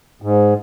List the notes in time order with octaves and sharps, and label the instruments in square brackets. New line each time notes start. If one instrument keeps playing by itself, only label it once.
[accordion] G#2